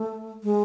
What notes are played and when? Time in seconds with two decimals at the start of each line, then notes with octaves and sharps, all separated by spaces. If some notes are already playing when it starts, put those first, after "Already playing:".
Already playing: A3
0.43 G#3